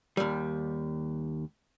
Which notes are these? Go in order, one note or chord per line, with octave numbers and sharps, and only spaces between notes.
D#2 G3